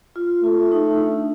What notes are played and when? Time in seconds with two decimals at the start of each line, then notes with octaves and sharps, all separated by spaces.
0.16 F4
0.43 A3 F4
0.72 D#4
1.00 D4